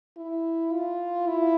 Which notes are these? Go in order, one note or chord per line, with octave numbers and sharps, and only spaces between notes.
E4
F4
E4